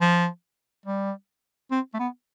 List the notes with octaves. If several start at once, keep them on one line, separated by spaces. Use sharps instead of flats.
F3
G3
C4
A3
B3